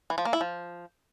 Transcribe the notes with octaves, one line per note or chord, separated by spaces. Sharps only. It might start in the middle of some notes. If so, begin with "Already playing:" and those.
E3
F3
A#3
E4
F3